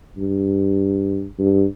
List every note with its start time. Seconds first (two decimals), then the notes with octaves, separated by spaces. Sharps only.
0.17 G2
1.39 G2